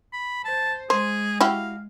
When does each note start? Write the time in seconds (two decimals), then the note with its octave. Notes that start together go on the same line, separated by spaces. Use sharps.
0.13 B5
0.44 C5 A5
0.90 G#3 G#4 C5
1.41 E4 F#4 G4 F5